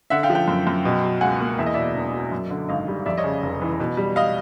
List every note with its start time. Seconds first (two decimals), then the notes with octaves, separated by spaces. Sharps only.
0.10 D3 E5 F#5
0.23 F5 G5
0.30 F3
0.35 F5 G5
0.48 F#2
0.67 F#2
0.85 B2
1.04 F#3
1.21 C#2 F#5 G#5
1.40 A#3
1.59 E2 E5
1.66 D#5
1.74 B2 D5 E5
1.95 E1
2.13 F#3
2.32 F#2
2.50 D3
2.69 G#1 D#5 F5
2.88 G3
3.06 F2 D5 E5
3.18 C#5 D#5
3.24 C#3
3.43 F1
3.62 E3
3.80 B2
3.97 G3
4.16 D#5 F5